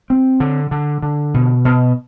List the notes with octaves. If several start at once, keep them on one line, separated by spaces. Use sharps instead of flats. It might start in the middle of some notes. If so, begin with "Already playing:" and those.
C4
D3
D3
D3
B2
B2